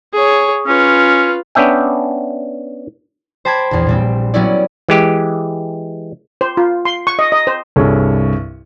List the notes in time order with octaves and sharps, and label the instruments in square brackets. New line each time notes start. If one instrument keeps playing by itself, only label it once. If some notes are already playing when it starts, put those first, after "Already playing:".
[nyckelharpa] G#4 C#5
[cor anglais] C#4 [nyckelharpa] F4 B4
[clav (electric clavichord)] B3 C#4 D4 E5 G5
[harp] C5 G5 A5 B5 D6 G#6
A#1 E2
A#2 G3 C4
F#3 G3 B3 C#4 E4 D5
[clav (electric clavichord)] E3 G#3 G4
[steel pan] C5
F4
C6
C#6
D#5
D#5
C5
[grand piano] C2 G2 G#4 A4 C#5 C#6